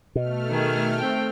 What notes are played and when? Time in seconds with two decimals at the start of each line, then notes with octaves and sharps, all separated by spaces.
0.15 B2 A3 F6
0.49 D#3 G#4
0.98 C4 G5